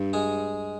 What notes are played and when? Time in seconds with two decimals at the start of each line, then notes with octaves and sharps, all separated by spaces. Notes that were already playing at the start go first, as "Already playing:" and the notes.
Already playing: G2
0.13 G#3 G#4